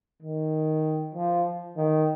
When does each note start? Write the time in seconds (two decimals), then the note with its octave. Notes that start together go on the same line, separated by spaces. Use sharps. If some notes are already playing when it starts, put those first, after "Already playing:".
0.22 D#3
1.15 F3
1.77 D#3